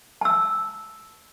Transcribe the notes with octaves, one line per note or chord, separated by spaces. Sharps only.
A5 E6